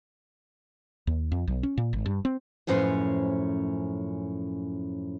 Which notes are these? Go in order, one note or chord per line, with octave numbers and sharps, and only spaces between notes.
D#2
F2
B1
C#4
A#2
G#1
G2
C4
F#2 A2 F3 C#4 B4 C5